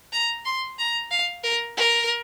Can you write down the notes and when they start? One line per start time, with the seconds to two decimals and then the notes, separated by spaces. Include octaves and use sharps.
0.13 A#5
0.45 C6
0.79 A#5
1.11 F5
1.44 A#4
1.77 A#4